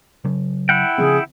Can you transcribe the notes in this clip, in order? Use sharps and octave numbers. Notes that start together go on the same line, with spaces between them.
C#3 F#3
E4 F#5 G5
C#3 F3 C4 G#4